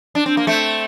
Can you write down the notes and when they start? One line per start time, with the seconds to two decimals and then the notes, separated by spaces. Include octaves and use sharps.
0.15 D4
0.26 C4
0.37 A#3
0.47 A3 C4